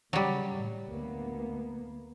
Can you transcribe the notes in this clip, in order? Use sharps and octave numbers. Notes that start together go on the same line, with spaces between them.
C#3 F#3 G3
A2
D2 A#3 B3